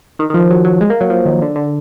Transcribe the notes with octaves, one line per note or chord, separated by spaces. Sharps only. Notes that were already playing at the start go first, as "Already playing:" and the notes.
D#3
D#3
F3
F#3
F#3
G#3
A#3
F#3
F3
D#3
D3
D3